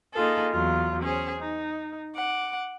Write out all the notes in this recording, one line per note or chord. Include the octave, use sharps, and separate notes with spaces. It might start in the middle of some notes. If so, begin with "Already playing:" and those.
A#3 D#4 F4 G#4 A4
E2 F#3 F4
C#4 G#4 C5
D#4
F#5 D6